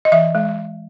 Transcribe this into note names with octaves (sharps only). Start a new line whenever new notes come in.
D#5
E3 E5
G#3